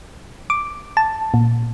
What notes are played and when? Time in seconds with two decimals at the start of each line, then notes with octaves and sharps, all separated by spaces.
0.50 D6
0.97 A5
1.34 A#2